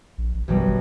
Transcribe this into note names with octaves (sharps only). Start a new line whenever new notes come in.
A#1
A1
F#2 B2 E3 G3
G#1